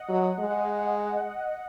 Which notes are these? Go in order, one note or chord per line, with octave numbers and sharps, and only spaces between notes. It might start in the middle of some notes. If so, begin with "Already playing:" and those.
Already playing: D#5 F#5
F#3
G#3